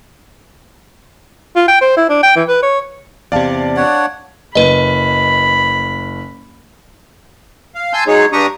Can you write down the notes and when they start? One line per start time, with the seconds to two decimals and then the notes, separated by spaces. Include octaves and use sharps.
1.56 F4
1.68 G5
1.81 C5
1.97 E4
2.09 D4
2.23 G5
2.36 E3
2.48 B4
2.63 C#5
3.32 E2 C3 D5 F5 A5
3.77 D4 C#5 F#5
4.55 F#1 B4 D#5 B5
7.75 F5
7.93 G#5 A5 C6 E6 G6
8.07 F#3 G#3 D#4 G#4 C#5
8.33 G2 D4 G4 A#5 C#6 D#6